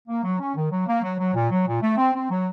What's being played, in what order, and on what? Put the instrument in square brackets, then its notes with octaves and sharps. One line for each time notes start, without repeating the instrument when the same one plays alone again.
[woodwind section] A#3
F#3
C#4
D#3
F#3
A#3
F#3
F#3
A#2
F#3
A#2
A3
C4
C4
F#3